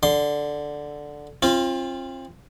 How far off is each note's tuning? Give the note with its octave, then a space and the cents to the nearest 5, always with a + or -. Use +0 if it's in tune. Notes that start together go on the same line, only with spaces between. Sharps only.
D3 +0 C6 +0
C4 +35 F4 -15